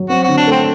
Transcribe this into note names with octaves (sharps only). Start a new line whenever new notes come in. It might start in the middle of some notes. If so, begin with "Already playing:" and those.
Already playing: F#3
C4 F#4
F#4
D3
D4
A3 C4